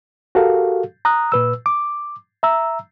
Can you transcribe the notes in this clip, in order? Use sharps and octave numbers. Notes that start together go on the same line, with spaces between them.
F#4 G4 A4 A#4 F5
A#5 D#6 F#6
A#2 B4 E6
D6
E5 A#5 E6